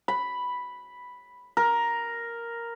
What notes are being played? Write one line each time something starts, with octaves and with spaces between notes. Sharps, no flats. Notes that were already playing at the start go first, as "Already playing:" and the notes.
B5
A#4